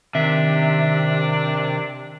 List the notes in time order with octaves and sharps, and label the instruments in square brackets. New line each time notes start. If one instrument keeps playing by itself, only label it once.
[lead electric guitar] C3 [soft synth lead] D#3 [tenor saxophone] D4 [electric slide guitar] E5